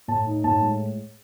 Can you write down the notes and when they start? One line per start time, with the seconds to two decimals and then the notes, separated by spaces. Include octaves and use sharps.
0.08 A2 A5
0.26 D#4
0.44 A2 A5
0.62 G#3